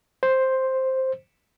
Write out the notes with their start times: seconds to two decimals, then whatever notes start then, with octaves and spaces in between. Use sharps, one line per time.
0.23 C5